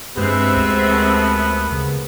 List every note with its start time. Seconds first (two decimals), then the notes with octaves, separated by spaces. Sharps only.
0.17 G2 G#3 B3 C4 G4 E5
0.56 D2
0.89 C#4 A#4 A5
1.72 C#3